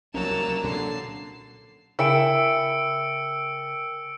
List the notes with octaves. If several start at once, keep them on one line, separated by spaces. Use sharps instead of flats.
C2 F3 F#3 A#3 C#4 A5 E6
A#2 D3 A5 C7
C#3 E4 A#4 G5 G#5 E6 C#7 D7